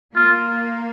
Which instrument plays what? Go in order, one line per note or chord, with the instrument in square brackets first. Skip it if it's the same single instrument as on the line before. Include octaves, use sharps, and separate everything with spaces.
[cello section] A#3 [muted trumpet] F4